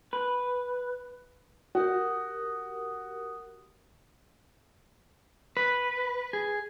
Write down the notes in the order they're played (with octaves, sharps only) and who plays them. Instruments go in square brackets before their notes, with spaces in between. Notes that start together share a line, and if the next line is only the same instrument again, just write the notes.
[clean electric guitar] B4
[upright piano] F#4 [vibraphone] G4 A#4 D#6
[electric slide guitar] B4
G#4